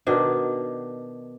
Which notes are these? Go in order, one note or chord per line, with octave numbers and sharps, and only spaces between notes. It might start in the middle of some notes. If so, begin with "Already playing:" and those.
B2 D#3 D4